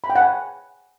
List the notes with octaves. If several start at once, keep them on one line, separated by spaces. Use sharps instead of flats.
B5
G5
F#5
G#5